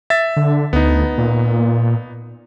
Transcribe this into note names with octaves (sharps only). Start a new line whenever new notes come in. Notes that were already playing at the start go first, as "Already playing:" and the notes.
E5 A6
D3
D2 B3 D#4
A#2